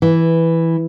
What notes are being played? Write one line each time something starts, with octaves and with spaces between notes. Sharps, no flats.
E3